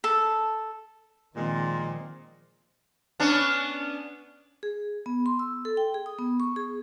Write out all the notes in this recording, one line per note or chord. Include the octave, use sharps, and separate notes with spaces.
A4
A#2 D#3 F3 G#3 C4
B3 C#4 D4
G#4
B3
C6
E6
A4
G5
G#4
D#6
B3
C#6
G#4